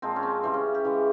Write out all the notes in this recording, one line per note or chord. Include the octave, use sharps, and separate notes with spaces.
A#2 F3 G#3 C4
C#4
C4
C#3 E3 G3 C4
C#4
G4
C#3 E3 G#3